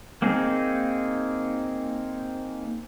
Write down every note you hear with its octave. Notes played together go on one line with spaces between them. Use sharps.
A#3 C4 D#4 G#4